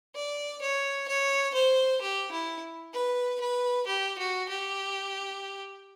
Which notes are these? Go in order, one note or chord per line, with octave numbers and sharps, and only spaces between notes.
D5
C#5
C#5
C5
G4
E4
B4
B4
G4
F#4
G4